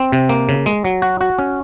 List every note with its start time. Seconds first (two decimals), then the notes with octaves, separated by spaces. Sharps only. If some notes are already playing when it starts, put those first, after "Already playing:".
Already playing: C4
0.12 C3
0.29 A#3
0.49 C#3
0.66 G#3
0.84 F#3
1.02 F#4
1.21 F#4
1.39 C#4